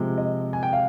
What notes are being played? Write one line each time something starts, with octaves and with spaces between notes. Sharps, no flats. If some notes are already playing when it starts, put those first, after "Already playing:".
Already playing: C3 F3 G#3
D#5
G#5
G5
F5